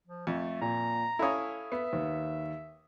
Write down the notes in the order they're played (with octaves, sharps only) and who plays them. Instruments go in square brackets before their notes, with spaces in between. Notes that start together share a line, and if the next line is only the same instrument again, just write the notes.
[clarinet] F3
[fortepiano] F2 [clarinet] A3
[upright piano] A#2 [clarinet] A#5
[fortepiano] C#4 E4 [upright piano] A4 F5 D#6
[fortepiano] B3 [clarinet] E5
[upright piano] D#2